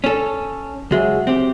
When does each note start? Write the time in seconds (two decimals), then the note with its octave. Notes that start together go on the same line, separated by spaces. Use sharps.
0.04 C#4 A4
0.91 C#2 F#3 G#3 F#4 E5
1.27 C4 G4